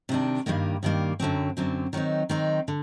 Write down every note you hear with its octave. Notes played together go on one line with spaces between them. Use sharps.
C3 D#3 G3 D4
G2 D#3 G3 A#3
G2 D#3 G3 A#3
F#2 D3 F#3 C4
F#2 D3 F#3 C4
D#3 F#3 C4 D#4
D#3 F#3 C4 D#4
D3